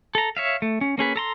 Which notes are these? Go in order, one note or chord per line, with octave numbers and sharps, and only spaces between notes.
A4 A#5
C#5 E5 F5
A3
C#4
A#3 C#4 G#4 B4
A4 A#5 C6